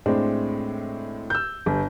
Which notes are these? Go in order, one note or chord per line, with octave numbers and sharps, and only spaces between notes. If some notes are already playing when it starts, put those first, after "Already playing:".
A2 G#3 C4 D4
E6 G6
G1